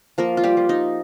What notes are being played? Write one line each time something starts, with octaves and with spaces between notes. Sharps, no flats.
F3 A#3 A#4
F4
G3 G4
F3
D#4